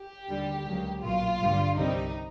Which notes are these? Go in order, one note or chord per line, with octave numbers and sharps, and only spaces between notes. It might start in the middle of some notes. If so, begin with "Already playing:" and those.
Already playing: G4
D#2 D3 G3
C#2 C#3 F#3 A#3
B1 A#2 F#3 F4
G1 G2 D3 G3
C2 C3 D#3 G3 D#4